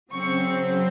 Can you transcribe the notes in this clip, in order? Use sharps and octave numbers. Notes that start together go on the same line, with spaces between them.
C#3 F#3 C4 C#6